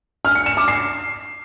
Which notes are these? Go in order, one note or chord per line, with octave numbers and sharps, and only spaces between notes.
F6
C#7
E7
D6
C7